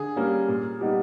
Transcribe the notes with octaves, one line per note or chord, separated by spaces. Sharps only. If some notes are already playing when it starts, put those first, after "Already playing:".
Already playing: D3 G#4
G3 A#3 C#4
A#2
G3 B3 D#4